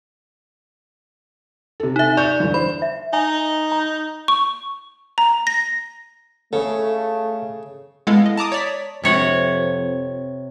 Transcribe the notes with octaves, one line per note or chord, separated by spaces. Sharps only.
C3 A4
D#4 E5
D5 C#6 G6
G1 E2
C5 B5
E5
D#4 G#5
A#5
C#6
A#5
A#6
C#3 A3 A4 C#5
G#3 B3 E4 A4 F5
D#5
A5 A#5 D6 D#6
C#5 D5 B6
F2 C3 C#5 F#5